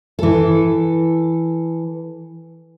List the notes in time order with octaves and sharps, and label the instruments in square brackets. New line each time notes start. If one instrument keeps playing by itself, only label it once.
[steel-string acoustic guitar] E3 A4